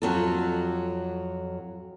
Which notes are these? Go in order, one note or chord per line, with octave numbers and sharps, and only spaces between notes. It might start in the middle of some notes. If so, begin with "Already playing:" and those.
F2 F#3 A4